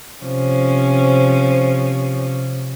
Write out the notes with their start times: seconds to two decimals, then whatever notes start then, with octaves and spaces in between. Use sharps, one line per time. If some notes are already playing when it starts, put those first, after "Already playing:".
0.24 C3 F3 C#4